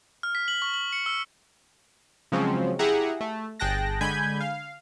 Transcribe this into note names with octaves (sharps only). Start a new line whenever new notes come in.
F6
B6
F#7
C#6
F#7
C#7
E6
C#3 F3 F#3 G#3 C4 C#4
E4 G4 G#4 E5 F#5 A#5
A3
G1 G#4 G5 A5 F#6 A#6
D3 G#3 G#5 B5 G6 G#6
F5